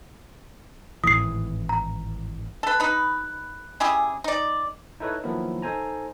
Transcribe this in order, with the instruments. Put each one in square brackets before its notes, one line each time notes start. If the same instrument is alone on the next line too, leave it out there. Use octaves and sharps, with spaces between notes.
[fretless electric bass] G#1 A2 E3 [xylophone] D#6 C7
[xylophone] A#5
[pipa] A4 B4
D#4 B4
C#4 E4 G4 G#4
D#4 D5
[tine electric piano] D#4 E4 A4 B4 C#5
D#3 F3 F#3 A#3 B3 E4
D#4 A4 C5 G#5 A#5